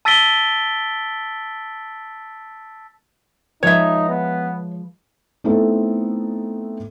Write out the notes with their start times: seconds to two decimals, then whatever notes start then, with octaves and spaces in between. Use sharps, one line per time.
0.05 A5 E6 A6 B6 D7 G7
3.63 F3 G#3 D#4 B4 C#5 E5
4.09 B3
5.44 A3 B3 C4 D#4 E4 A4